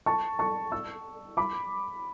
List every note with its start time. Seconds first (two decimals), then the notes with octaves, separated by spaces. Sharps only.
0.06 A5 C#6
0.39 A5 C#6
0.72 C#6 E6
1.37 B5 D6